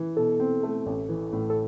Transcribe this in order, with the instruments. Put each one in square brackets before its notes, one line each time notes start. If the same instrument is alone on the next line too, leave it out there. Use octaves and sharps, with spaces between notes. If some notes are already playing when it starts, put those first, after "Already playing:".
Already playing: [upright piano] E3
[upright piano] B2 [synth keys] A4
[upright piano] C4
A3
A1
E3
A2
[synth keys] A4